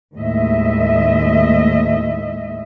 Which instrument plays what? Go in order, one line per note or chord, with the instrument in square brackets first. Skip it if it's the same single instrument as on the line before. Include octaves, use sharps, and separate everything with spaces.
[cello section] D#2 A2 G#3 D#5 E5